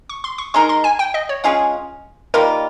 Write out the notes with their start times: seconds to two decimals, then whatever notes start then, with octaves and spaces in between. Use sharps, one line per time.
0.09 C#6
0.24 C6
0.38 C#6
0.54 G#3 D#4 A#4 C6
0.69 C6
0.84 G#5
0.99 G5
1.14 D#5
1.29 C#5
1.44 G#3 C#4 F4 G#4 F5
2.34 D#3 G3 A#3 F4 A#4